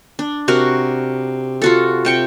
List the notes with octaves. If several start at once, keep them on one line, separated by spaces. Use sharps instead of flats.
D4
C3 F#4 A#4
F4 F#4 A4
C3 G5 C#6